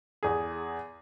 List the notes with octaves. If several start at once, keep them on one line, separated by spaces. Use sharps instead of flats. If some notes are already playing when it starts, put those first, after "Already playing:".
E2 G#4